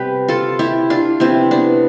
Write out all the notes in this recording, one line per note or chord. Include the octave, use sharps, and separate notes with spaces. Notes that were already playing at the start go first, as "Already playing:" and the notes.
Already playing: C3 G3 B3 G4 B4
F4 A4
E4 G4
D4 F4
C3 F3 B3 C4 E4
B3 D4